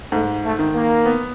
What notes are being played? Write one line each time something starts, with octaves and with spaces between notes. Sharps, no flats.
G#2 A3
A3
D#3
A#3
B3